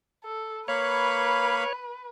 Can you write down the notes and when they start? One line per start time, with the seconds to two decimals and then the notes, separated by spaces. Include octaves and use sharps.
0.24 A4
0.68 A#3 B4 C#5 F5 B5